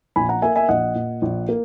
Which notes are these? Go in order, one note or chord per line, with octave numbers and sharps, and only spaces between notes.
A#1 G#5 B5
F#5 A#5
A#3 E5 G#5
E5 G#5
A#1 D#5 F#5
A#2
A#1
A#3